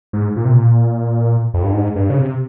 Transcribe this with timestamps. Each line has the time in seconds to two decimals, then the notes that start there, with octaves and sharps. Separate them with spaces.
0.13 G#2
0.36 A#2
0.45 C3
0.53 A#2
1.54 F2
1.63 G2
1.73 G#2
1.95 G2
2.10 C#3
2.18 C3